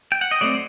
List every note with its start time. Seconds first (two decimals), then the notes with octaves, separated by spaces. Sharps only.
0.12 G5
0.21 F#5
0.31 D#5
0.41 F#3 A3 C4 D5